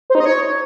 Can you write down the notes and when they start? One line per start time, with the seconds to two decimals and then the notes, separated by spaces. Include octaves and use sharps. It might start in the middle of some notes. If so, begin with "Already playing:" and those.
0.10 C5
0.15 D#4
0.20 D#5
0.25 C#5